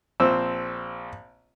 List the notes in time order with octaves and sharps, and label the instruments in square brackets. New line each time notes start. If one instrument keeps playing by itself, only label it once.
[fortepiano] A#1 C4 E6